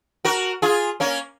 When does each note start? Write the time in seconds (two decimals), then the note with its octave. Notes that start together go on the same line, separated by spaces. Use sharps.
0.25 F#4 A#4
0.62 F4 G#4
1.00 A#3 C#4